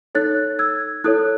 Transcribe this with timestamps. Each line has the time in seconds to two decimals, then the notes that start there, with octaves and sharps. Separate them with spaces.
0.15 D#4 A4 C#5 F#6 A6
0.59 E6 G#6
1.04 E4 A4 C#5 D#6 F#6